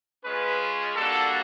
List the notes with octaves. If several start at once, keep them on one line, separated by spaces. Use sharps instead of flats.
G#3 C#4 F4 B4
G3 A#3 D4 F#4 A4